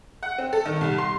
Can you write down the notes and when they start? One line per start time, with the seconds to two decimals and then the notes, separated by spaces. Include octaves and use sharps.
0.23 F#5
0.38 C4
0.53 A4
0.65 D#3
0.81 C2
0.98 C6